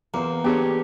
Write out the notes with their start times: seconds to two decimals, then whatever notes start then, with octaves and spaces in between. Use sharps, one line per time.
0.14 E2 A#3 C4 C5
0.44 B3 D4 G4 G#4 C5 C#5